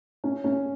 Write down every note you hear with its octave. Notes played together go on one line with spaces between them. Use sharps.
C#4
C#4